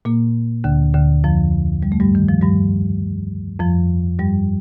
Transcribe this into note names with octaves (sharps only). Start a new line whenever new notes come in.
A#2 A#3
D2 D3
D2 D3
F2 F3
G3
A3
G2 G3
D#3
F3
G2 G3
F2 F3
G2 G3